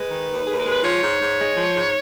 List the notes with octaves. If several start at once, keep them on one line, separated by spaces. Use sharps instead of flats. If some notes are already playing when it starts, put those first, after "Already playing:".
Already playing: G#3 B4
D#3
D#2
D#2 G#4
A#4
G#3
B4
F3 C#5
G#2
G#2
G#3
F3
G#2